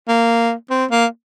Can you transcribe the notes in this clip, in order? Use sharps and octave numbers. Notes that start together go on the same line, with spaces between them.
A#3
C4
A#3